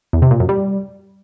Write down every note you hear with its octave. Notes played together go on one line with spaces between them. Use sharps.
E2
C3
A#2
F#2
G3